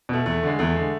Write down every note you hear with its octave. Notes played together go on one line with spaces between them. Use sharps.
B2 A3
E2 A3
D3 G#3
E2 A3
D3 G#3